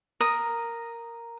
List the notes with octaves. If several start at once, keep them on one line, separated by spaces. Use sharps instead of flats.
A#4 D#6